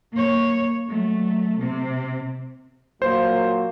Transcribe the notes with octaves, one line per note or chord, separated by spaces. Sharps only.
A#3 C#5
F#3 A3
C3 C4
A#2 F#3 A#3 C5